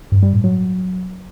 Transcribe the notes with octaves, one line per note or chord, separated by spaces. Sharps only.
G2
G3
A2
F#3